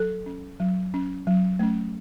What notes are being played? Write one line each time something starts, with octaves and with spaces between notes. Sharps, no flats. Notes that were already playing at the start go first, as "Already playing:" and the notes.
Already playing: F#3 A4
C#4
F#3
C#4
F#3
A3 C#4